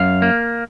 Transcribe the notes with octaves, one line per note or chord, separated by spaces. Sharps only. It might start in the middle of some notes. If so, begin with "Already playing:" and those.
Already playing: F#2 F5
A#3